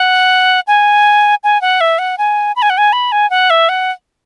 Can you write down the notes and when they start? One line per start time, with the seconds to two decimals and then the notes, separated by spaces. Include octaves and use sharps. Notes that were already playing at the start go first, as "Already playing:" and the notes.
Already playing: F#5
0.67 G#5
1.43 G#5
1.61 F#5
1.81 E5
1.99 F#5
2.18 G#5
2.56 B5
2.62 G#5
2.70 F#5
2.78 G#5
2.93 B5
3.12 G#5
3.30 F#5
3.50 E5
3.69 F#5